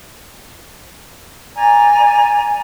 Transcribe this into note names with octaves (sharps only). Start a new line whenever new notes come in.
D5 G#5 A#5